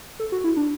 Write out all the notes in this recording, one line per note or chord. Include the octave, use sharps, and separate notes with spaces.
A4
F#4
E4
D4